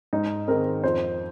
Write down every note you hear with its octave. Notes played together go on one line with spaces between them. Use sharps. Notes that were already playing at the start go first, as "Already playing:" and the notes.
G#2 D#4
D#3 G#3 C4 A#4
F2 C5